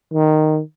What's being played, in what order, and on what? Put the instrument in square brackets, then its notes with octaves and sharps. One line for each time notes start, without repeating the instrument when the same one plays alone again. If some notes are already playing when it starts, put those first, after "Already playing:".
[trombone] D#3